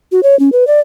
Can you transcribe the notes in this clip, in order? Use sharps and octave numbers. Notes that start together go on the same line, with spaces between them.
F#4
C#5
C#4
B4
D5